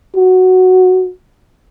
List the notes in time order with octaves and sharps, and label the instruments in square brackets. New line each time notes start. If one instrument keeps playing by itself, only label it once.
[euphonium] F#4